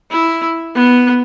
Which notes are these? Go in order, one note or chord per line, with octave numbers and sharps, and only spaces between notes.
E4
B3